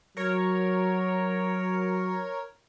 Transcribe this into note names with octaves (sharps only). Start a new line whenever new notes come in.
F#3 A#4 C#5